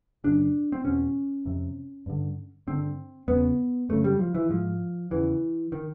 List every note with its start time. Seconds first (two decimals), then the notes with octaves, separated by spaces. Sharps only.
0.24 F#2 C#3 D4
0.72 C4
0.84 E2 B2 C#4
1.45 F2 C3
2.06 G2 D3
2.67 G2 D3 C4
3.28 E2 C#3 B3
3.89 F#2 C#3 A3
4.04 G3
4.19 F3
4.35 E3
4.50 G#2 F3
5.11 E2 C#3 E3
5.72 D#3